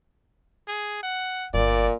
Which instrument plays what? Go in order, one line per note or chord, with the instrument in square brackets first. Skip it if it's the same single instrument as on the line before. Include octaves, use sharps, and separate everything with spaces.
[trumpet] G#4
F#5
[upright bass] G1 G2 [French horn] A#2 [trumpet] D5